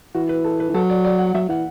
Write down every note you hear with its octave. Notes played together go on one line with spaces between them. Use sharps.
E3 F#4
B4
A4
B4
E3
F#3 A4
D5
D5
F#5
F#3 E5
E3 F#5